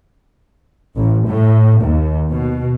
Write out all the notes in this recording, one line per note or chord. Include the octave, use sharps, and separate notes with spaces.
A1
A2
D#2
B2